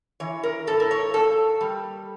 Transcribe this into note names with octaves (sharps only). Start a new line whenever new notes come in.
E3 C#5
A#4
A2 A4
A#4
C#5
A#3 A4
G3